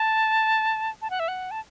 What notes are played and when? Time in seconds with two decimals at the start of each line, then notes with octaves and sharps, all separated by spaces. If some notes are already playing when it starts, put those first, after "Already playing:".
Already playing: A5
1.02 A5
1.10 F#5
1.20 E5
1.28 F#5
1.51 A5